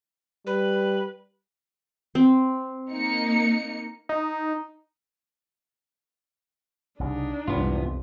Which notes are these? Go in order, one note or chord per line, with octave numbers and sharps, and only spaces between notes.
G3 B4
C4
A#3 D#4 C#7
D#4
C2 C#3 D4 D#4
C2 F2 G#2 C3 E3 B3 F4